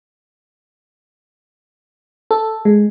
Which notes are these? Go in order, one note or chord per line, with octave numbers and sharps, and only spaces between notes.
A4
G#3